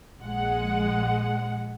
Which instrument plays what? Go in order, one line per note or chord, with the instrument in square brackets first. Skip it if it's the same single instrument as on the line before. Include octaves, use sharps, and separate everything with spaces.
[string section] A#1 G#3 F#5